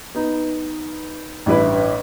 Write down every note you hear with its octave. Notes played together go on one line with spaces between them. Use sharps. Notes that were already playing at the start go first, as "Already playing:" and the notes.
B3 D#4
A1 G2 E4 B4